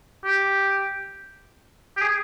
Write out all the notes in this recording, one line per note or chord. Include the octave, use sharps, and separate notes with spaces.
G4
G4
G#4